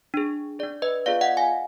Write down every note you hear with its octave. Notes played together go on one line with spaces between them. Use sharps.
D4 G#4
D4 G#4 D5
B4 D#5
B3 F4 G#4 D5 F5
D#5 F#5
F5 G#5